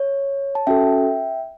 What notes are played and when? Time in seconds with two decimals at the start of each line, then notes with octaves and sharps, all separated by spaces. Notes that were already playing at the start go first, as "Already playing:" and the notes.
Already playing: C#5
0.55 A5
0.67 C#4 F#4 A4 E5 G5